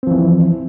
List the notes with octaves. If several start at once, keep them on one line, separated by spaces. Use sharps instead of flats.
E3 F3 C4